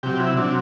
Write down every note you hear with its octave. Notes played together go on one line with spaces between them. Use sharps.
C3 F#3 G4
E4
C3 F#3 D4